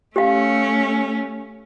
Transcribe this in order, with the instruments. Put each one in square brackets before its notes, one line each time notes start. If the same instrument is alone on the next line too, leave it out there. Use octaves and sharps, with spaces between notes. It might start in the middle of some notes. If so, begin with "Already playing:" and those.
[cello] A3 C#4 [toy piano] G4 F5